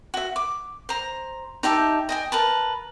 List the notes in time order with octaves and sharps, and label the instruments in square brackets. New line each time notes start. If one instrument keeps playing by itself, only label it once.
[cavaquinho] F#4 E5
D6
C5 A#5
D#4 G4 E5 A5
D#5 G5 G#5
A#4 B4 A5